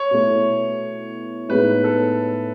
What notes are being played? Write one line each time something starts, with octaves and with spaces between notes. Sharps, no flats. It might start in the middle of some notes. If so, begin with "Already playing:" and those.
Already playing: C#5
B2 A3 E4
A2 G#3 B3 D#4 B4
A4